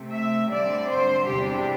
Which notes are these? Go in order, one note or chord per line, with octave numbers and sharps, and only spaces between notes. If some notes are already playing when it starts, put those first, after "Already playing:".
Already playing: C3 A3 C4
E5
D3 G3 C4 D5
C5
E2 C3 G3 D4 G4